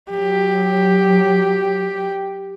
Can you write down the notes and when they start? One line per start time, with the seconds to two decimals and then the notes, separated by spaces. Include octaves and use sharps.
0.10 F#3 G4